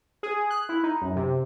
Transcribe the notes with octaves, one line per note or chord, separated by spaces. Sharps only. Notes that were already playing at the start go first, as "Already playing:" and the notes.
G#4
F#6
E4
D#4
F#2
C3